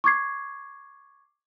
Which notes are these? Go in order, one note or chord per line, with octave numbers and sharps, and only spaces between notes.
C#6 D6 G#6 C7